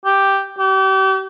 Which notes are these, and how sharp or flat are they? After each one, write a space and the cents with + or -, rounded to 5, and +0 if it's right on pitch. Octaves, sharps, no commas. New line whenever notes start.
G4 +0
G4 -35